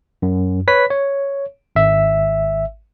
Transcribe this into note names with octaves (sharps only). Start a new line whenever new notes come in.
F#2
B4 C#5 B6
C#5
G#1 E5